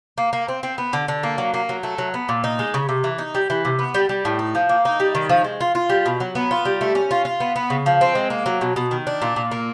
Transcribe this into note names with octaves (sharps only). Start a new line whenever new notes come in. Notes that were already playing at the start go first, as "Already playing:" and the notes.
A#3
A#3
C4
C4
B3
D3
D3
A#3
F#3
A#3
F#3
A3
F#3
B3
A#2
D#4
G#3
C#3
C3
E3
D#4
G3
E3
C3
B3
G3
G3
A2
D#4
F3
A#3
D#4
G3
D#3
F3
G#3
F4
F4
G3
B2
F#3
B3
F4
G3
A3
C#4
F4
F4
B3
B3
C#3
F3
C4
G#3
A#3
F#3
B2
B2
D#3
D4
A#2
A#2
A#3